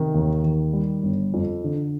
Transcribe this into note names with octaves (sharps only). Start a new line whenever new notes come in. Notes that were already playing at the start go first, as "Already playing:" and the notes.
Already playing: C3 D#3
D#2
D#3
G3
G1
F2
D3